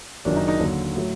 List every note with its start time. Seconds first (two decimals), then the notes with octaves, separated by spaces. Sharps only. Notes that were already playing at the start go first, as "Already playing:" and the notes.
0.25 F#1 F#2 D#3 F#3 D4
0.36 D#4
0.48 D#4
0.59 D#2 D3 F#3
0.96 A2 F#3